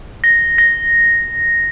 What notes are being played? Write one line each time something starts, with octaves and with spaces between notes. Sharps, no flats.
A#6
A#6